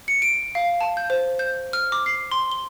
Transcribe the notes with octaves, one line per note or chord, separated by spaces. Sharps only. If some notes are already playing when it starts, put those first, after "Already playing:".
C#7
D7
F5
A5
G6
C5
G6
F6
D6
C7
C6
G7